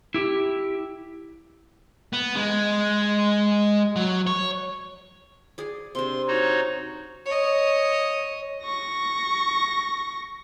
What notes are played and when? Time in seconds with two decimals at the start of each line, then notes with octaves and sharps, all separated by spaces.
0.14 E4 G4
2.13 B3
2.36 G#3
3.96 F#3
4.27 C#5
5.58 G#4 D5
5.95 C3 D4 C6
6.28 D#4 F#4 C#5
7.26 C#5 D#5
8.64 C#6 A#6